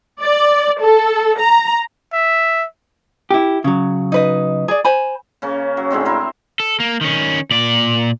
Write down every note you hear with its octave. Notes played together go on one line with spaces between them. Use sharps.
D5
A4
A#5
E5
E4 G4
C#3 F#3
D#4 B4 D#5
G#4 D5
C5 G#5 B5
C#3 A#3 C#4
F#3
A2 D3 G#3 C4
E4 A#4 C5
A4
A#3
D#3 C#4
A#2 D5